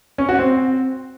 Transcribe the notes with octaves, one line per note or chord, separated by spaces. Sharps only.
C#4
F#4
C4